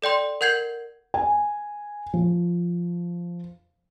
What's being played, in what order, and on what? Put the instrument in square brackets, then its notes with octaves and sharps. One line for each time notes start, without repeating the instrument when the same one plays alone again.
[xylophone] A4 D5 G5 C6
A#4 F#5 G6 G#6 C7 F#7
[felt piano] G#5
F3